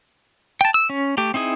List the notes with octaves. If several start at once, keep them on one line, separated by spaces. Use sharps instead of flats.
G5 A5
E6
C#4
A3 G4
C4 D#4 E4 G#4